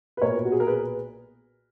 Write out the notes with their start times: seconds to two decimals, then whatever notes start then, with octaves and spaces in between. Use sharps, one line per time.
0.17 B4
0.21 B1 A#2 A#4 C#5
0.45 F#4
0.52 G#4
0.60 A#4
0.67 G#4 B4